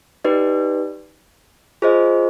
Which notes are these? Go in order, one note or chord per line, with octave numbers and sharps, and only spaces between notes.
D#4 G4 B4 D5
F4 G#4 C5 D#5